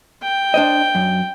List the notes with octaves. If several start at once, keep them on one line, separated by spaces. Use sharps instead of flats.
G5
D4 C5 D#5
F#2